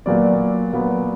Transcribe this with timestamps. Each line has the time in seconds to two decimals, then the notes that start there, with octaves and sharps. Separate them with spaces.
0.06 A#2 F#3 B3 D5
0.73 A#2 F#3 B3